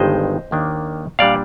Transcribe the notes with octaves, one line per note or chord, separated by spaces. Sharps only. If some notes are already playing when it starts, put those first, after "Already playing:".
Already playing: G1 G2 D#3 G#3 D#4 C5 D#5
D#2 D#3 A#3 D4
A#2 G3 D4 D5 F5